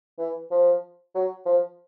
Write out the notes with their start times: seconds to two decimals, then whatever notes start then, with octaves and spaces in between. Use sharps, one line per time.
0.18 E3
0.51 F3
1.15 F#3
1.46 F3